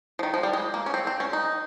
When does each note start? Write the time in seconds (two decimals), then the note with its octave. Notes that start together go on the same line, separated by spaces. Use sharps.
0.19 F3
0.23 D#3
0.34 F3
0.43 G3
0.53 G#3
0.74 A#3
0.86 C#4
0.94 C4
1.07 C4
1.20 C#4
1.33 D#4